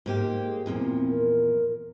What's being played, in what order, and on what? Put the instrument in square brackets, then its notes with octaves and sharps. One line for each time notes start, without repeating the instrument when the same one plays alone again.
[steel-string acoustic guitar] G#2 A#3 G4
[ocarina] G#4
[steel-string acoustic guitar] E2 A#2 F3 [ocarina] C4
[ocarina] A#4